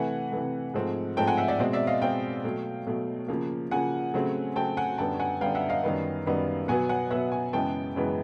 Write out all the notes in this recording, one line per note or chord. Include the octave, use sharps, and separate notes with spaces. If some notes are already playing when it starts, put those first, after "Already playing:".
Already playing: C3 E3 A3 F#5 G#5
C3 E3 A3
G#2 F3 A3 C4
G#2 F3 A3 C4 G5 A5
F#5 G#5
E5 F#5
D5 E5
B2 G#3 C4
D5 E5
D#5 F5
B2 G#3 C4 F5 G5
B2 F#3 A3
B2 F#3 A3
C#3 F3 A#3
C#3 F3 A#3 F#5 G#5
C#3 F#3 A3 C4
C#3 F#3 A3 C4 G5 A5
F#5 G#5
F#2 D3 G3 B3 G5 A5
F#5 G#5
F#2 D3 G3 B3 F5 G5
E5 F#5
D#5 F5
F#2 D#3 G3 B3
F#2 D#3 G3 B3
B2 F#3 B3 F#5 G#5
F#5 G#5
B2 F#3 B3 E5 F#5
F#5 G#5
F#2 C#3 E3 G#3 B3 G5 A5
F#2 C#3 E3 G#3 B3